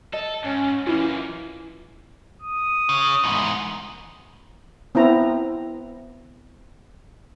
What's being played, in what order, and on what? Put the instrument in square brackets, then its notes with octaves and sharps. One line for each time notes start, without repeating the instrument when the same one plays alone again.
[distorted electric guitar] A4 [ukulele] D#5
[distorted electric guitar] G#2 [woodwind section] C#4
[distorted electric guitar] F#2 A#3 [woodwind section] E3 [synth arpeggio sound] C#4 E4 F4
[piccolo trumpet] D#6
[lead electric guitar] C#3
E2 G#2
[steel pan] B3 C4 E4 A#5